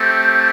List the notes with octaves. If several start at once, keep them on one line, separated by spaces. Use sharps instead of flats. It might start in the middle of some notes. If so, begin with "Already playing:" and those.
Already playing: A3 C4 G4